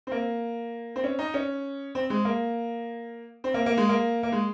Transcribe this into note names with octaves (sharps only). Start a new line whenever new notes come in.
C4
A#3
C4
C#4
D#4
C#4
C4
G#3
A#3
C4
A#3
A#3
G#3
A#3
A#3
G#3